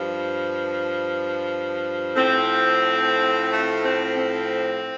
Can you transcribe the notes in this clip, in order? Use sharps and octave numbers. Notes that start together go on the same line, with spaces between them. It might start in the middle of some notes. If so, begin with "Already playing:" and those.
Already playing: G2 F3
A2 F3 C4
A3
C4
C4